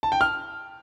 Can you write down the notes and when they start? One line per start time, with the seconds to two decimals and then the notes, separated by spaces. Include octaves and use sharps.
0.03 A5
0.12 G5
0.21 F6